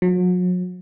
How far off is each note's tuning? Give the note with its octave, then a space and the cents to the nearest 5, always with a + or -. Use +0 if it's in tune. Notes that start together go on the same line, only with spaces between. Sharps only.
F#3 -40